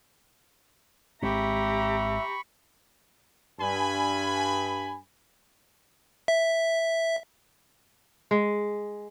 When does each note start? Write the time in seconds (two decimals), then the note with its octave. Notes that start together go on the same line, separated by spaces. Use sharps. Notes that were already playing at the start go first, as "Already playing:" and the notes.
1.22 G#1 G#3 C4 G4 E5 A#5 B5 C#6
3.59 G2 G#5 B5
6.28 E5
8.31 G#3